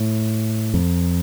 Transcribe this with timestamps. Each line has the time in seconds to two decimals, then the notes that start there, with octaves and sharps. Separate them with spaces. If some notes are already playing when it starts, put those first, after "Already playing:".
Already playing: A2
0.74 F2